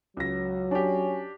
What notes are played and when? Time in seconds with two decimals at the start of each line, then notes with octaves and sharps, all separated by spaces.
0.17 C#2 F#3 A#6
0.71 C#4 D4 G4